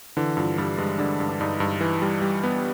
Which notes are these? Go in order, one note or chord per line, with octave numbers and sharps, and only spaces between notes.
D3 E3
G2 F3
G2 G3
G2 G#3
D3 D4
G2
D4
G2 D#4
G2
E3
G3
G3
B3